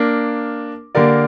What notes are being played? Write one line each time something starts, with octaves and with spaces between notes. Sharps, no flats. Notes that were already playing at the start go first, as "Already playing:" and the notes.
Already playing: A#3 D4 A#4
D3 A#3 G4 A#4 D5